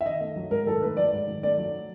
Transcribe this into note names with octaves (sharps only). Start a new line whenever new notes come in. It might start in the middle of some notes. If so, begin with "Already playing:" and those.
E5
D#3 D#5
A3
F#3
G#2 A#4
D#3 A4
A3 B4
F#3 D5
G#2
D#3
A3 D5
F#3